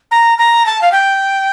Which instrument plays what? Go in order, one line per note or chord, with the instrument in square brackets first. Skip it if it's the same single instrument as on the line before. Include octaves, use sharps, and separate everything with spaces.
[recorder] A#5
A#5
A5
F5
G5